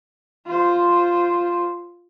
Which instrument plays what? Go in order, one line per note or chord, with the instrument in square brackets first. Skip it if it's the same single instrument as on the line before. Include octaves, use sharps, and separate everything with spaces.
[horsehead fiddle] F4 C5